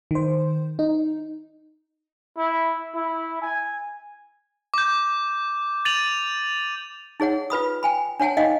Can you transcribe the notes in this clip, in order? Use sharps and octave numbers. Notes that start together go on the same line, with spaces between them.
D#3 C5
D#4
E4
E4
G#5
D6 G6
A6 D#7 F7 F#7
D#4 G#4 C#5 F#5
F4 B4 B5 D#6
G5 G#5 B5
D4 C#5 F#5 G#5 A5
D#4 D#5 F5 G5